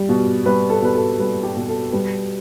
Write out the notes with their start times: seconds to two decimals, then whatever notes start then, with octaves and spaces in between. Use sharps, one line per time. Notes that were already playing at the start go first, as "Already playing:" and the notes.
Already playing: G3
0.09 B2
0.45 G3 B4
0.70 A4
0.82 B2 B4
0.95 A4
1.19 G3 B4
1.43 G4
1.57 B2
1.69 A4
1.93 G3 B4